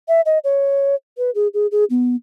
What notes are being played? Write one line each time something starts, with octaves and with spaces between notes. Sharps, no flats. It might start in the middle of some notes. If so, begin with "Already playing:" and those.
E5
D#5
C#5
B4
G#4
G#4
G#4
B3